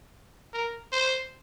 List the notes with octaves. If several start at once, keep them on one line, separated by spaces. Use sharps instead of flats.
A#4
C5